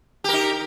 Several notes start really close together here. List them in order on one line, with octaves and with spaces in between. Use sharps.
G4 A#4 D#4